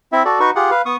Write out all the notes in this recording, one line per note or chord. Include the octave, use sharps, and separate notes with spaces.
C4 E4 E5
F#4 A4 D5
D#4 F#4 B4 C#6
F4 G4 G#4 F#5
B4 F5
B3 C#6 D#6